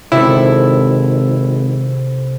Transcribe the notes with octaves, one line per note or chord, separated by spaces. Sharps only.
G#1 C3 E4 A4